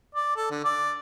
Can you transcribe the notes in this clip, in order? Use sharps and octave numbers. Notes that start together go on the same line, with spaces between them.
D5
A4
D3
D5